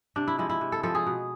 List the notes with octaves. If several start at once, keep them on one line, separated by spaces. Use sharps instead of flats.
C3 D4
E4
F3 G#3 E4
E4
C3
A4
F3 G#3 A4
G#4
B2